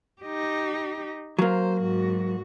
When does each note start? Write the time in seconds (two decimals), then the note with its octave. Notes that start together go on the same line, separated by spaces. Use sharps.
0.22 D#4 G4
1.39 F#3 A#3 C5
1.80 G#2 F#4